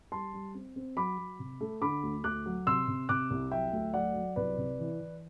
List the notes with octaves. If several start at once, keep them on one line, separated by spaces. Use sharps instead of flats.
G3 A5 C6
G3
C4
C4
F#3 B5 D6
F#3
C3
A3
D3 B5 D6
D2
D2 D6 F#6
F#3
C3 C6 E6
C3
C3 D6 F#6
C2
F#3 E5 G5
D2
F#3 D5 F#5
F#3
C2 B4 D5
C3
E3
E3